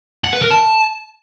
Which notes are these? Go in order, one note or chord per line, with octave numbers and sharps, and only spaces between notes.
F#5
B4
A#4
A5